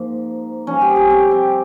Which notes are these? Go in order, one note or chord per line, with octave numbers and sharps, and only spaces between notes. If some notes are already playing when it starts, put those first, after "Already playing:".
Already playing: G#2 F3 A#3
G2 F3 C#4
G4
G#4
G4
C4
C4